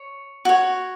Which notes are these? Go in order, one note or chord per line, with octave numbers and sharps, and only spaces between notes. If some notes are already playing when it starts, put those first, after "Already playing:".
Already playing: C#5
F#4 C#5